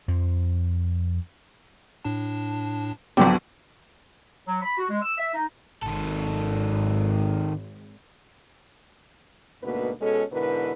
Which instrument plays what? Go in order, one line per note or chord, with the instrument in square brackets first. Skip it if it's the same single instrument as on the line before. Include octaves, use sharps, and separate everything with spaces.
[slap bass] F2 F3
[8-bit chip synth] A2 D4 A5
[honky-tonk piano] C2 D3 [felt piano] F3 F#3 B3 [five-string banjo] G4 [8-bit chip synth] D5
[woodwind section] F#3
B5
F#4
G#3
E6
E5
D#4
[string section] G#1 [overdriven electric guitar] D#3 A4
[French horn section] D2 G#2 B2 A#3 B3 B4
B2 G#3 C#4 A4
G#2 B2 D3 E4 A#4 B4